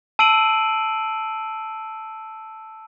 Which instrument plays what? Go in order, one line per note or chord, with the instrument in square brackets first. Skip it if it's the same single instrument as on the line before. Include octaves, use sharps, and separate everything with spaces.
[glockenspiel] A5 E6 C7 D7 D#7 F#7